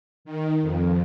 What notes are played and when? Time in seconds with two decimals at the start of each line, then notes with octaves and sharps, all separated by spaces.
0.25 D#3
0.62 F2